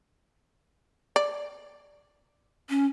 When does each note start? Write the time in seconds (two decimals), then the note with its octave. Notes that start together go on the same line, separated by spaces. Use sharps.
1.16 D5
2.70 C#4